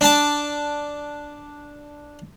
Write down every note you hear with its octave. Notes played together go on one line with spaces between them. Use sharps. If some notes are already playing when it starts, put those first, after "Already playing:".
D4 A5